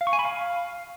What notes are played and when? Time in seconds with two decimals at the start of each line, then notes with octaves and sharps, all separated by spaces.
0.01 F5
0.07 C#6
0.13 G#5
0.19 B5
0.25 F5